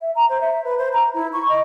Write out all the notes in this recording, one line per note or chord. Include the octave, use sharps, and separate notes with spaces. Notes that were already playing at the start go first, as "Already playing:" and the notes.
E5
A#5
C5
E5
B4
C5
A#5
E4
C#6
D#5